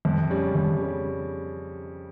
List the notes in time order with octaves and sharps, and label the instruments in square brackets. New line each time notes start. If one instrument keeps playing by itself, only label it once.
[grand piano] F2
C#3 G3 C#4
F2
C#3 G3 C#4